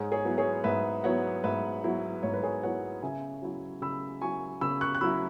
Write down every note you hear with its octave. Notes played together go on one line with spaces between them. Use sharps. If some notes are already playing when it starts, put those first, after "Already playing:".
Already playing: G#2 G#4 C#5
G#4 C#5
F#3 B3 E4
G#4 C#5
G#2 B4 E5
F#3 B3 E4 C#5 F#5
G#2 B4 E5
F#3 B3 E4
G#2 C#5
B4
G#4 C#5
F#3 B3 E4 C#5 F#5
C#3 E5 G#5
F#3 E4
C#3 B5 E6
F#3 E4 G#5 C#6
C#3 B5 E6
C#6 F#6
F#6
F#3 E4 B5 E6